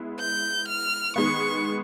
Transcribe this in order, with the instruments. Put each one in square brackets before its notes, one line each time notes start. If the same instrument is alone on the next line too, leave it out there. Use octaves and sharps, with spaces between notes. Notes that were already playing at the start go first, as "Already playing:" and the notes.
Already playing: [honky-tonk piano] G#3 B3 E4
[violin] G6
F6
[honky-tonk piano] D#3 G#3 B3 [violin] C#6